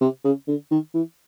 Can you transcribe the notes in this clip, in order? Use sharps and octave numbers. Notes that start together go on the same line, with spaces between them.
C3
C#3
D3
D#3
E3